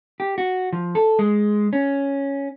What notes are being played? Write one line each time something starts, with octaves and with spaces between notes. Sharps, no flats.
G4
F#4
F3
A4
G#3
C#4